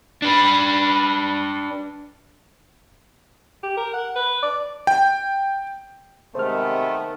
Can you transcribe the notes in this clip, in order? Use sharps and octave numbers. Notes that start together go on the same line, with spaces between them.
D4 B4
G4
A#4
F#5
B4
D5
G5
C3 D#3 G#3 A3 B3 C5 F6